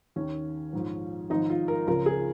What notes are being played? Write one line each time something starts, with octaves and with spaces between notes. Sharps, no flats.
D#2 D#3 C#4
A#1 G#2 F3
G#1 G#2 F3 D#4
F4
A#4
C#2 C#3 F3 A#4
G#4